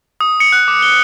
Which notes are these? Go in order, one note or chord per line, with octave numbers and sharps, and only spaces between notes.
D#6
C#7
F#6
D6
G7